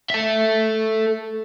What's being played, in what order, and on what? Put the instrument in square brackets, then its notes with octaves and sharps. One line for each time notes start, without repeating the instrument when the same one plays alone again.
[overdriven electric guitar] A4 E5